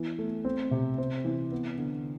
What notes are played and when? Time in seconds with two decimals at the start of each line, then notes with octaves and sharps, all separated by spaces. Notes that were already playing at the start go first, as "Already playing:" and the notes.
Already playing: E3 B3
0.19 A3
0.44 C4
0.71 C3
0.98 C4
1.25 E3
1.52 B3
1.78 D3